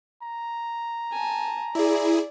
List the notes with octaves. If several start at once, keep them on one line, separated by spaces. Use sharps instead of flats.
A#5
G#5 A5
E4 G#4 D5